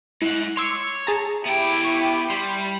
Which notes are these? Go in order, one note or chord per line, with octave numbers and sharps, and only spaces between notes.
G#3 E4 F#5
C#5 C6 D6 E6
G#4 A5 A#5
B3 E4 G4 G5
C#6
G3 C6